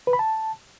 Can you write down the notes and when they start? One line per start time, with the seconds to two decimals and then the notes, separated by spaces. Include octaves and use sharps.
0.07 B4
0.13 B5
0.19 A5